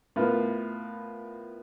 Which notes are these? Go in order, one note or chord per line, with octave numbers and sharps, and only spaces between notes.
A2 B3 F4 A#4